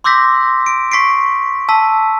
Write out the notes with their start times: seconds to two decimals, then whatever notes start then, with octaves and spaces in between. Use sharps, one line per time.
0.04 C6 D6 E6 G6 A#6 B6
0.66 D7
0.92 C#6 B6 C7 D7
1.69 A5 E6 B6